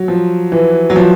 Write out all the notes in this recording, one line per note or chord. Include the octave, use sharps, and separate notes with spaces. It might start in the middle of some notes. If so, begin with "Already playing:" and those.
Already playing: F#3
F3
E3
F#3
F3